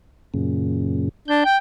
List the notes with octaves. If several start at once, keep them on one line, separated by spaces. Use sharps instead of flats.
F#2 A#2 C#3
D4 G6
G5